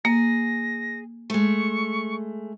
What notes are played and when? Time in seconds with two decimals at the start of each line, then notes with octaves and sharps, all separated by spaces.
0.05 A#3 G#4 A#6
1.30 G#3 A3 C#6